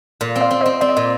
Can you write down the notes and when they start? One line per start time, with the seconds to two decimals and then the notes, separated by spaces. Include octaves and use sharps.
0.21 A#2
0.36 C4
0.41 D5 F5
0.51 C4
0.61 C4 C5 D#5
0.81 C4 D5
0.89 D#5
0.97 A#2 D5